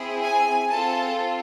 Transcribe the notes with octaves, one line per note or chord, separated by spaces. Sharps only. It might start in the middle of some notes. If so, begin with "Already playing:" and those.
Already playing: C4 E4 G#4
G#5
C4 F4 A4 A5